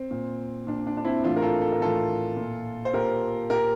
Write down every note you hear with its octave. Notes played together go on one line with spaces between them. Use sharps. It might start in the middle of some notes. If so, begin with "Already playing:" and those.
Already playing: C4
A#2
A#2 D4
D4
D4
C4 E4
A2 E3 D4 F4
A#4
F4 A4
A4
A#4
A2 E3 F4 A4
A#2
C5
A#2 G4 A#4
A#2 G4 A#4